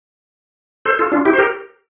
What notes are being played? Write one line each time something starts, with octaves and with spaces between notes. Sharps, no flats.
A4 C5
F4 A4
D4 F4
E4 G4
C5
G4 A#4